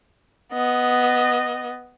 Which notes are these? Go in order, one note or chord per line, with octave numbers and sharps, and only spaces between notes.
B3 D#5